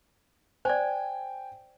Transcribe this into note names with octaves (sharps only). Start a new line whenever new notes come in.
C5 D5 G5 G#5